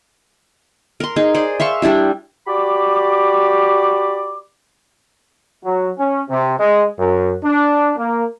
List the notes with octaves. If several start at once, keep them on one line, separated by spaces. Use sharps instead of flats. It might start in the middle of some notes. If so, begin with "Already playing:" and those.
A#4 C6
D#4 G#4
G#4 C5 D5
E5 F5 C6 C#6
G3 D4 E4 G4
F#4 G4 D5 B5 D6
F#3
C#4
C3
G#3
F#2
D4
A#3